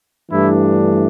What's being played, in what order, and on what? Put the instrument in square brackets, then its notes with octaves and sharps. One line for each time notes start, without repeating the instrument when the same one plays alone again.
[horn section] G2 E3 A3 D4 E4